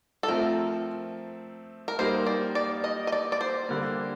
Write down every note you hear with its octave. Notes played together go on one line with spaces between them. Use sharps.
A4
F3 A3 C4 A#4
A#4
G3 A#3 D#4 A#4 C5
D5
D5
D#5
D#5
D5
D5
C5
D3 G3 A#3